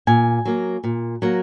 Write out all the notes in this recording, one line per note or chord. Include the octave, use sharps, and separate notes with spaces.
A#2 G#5
F#3 A#3
A#2
F#3 A#3